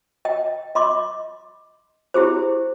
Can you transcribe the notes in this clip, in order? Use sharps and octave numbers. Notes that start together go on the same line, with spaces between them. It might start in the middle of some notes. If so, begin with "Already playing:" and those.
D#5 G5
D#5 C6 D6
E4 G4 G#4 C5